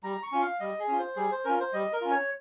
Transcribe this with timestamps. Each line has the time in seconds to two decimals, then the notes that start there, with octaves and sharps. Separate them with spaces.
0.03 G3 A#5
0.23 C#6
0.32 C#4 F4
0.41 F5
0.60 G3 D#5
0.79 G#4
0.88 C#4 F4
0.98 C5
1.16 G3 G#4
1.31 C5
1.44 C#4 F4 A#4
1.60 C5
1.73 G3 D#5
1.93 A#4
2.01 C#4 F4
2.11 C#5